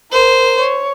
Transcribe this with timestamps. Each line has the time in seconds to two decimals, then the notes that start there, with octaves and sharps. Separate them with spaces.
0.12 A#4 C5
0.57 C#5